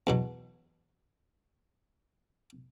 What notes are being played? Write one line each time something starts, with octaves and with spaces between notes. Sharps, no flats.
E2 B2 F#3